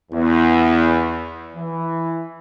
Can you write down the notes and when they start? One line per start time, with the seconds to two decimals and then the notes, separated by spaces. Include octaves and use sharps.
0.11 E2
1.55 E3